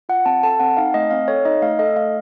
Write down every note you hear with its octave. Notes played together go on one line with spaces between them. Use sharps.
F4 F#5
C4 A5
A4 A5
C4 F#5
D#4 F5
A3 D#5
C4 F5
A4 C#5
D#4 D#5
A3 F5
A4 D#5
A3 F5